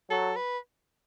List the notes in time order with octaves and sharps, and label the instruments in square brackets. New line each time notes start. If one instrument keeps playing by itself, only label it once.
[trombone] F#3 [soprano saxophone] A4
[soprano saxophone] B4